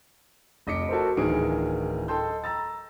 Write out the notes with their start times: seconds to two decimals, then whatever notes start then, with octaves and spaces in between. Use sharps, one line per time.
0.67 F1 D#5 D6 B6 C#7 D7
0.89 F#4 A4 A#4 C5
1.17 D1 D#3 E3 G#4 D7
2.08 A4 D#5 G5 A5 C6 G6
2.44 A#5 E6 A6